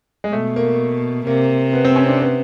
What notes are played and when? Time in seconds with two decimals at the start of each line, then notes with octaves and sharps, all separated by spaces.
0.24 G#3
0.33 B2 A3
0.56 A#3
1.27 C3 A#3
1.73 B3
1.85 C4
1.96 C#4
2.08 D4
2.21 B3